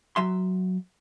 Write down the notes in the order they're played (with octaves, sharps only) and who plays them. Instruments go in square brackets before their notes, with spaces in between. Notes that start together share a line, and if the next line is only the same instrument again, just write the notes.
[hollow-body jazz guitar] F#3 E5 C6